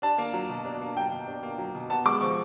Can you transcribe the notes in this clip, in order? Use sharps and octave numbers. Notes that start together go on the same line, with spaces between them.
D4 A5
A#3
F#3
B2
D4
A#3
F#3 G5
B2
D4
A#3
F#3
B2
B3 A5
G#3 D6
F3 C#6